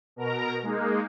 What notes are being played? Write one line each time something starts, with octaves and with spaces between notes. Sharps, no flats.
B2 A#4 A#5
G#3 A#3 D#4